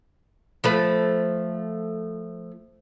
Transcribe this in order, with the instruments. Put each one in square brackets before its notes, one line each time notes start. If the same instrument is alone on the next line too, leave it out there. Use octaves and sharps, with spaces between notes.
[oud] F3 A3 B4